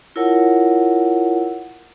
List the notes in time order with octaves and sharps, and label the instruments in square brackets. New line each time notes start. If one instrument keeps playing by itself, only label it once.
[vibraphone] E4 F4 A#4 C#5 F#5 A5